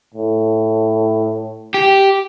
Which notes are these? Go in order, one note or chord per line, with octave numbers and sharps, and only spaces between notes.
A2
G4